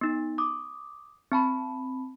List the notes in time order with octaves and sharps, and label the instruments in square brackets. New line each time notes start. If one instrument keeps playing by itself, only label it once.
[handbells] B3 D#4
D6 D#6
C4 A5 B5